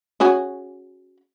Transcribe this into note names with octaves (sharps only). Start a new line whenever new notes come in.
C#4 F#4 G#4